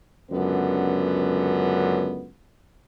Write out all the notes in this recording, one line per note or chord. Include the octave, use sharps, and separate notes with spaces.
C#2 F#2 D3 B3